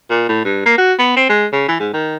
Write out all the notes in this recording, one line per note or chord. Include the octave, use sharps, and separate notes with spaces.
A#2
A2
G2
A#3
F#4
B3
C4
G#3
C#3
E3
G#2
D#3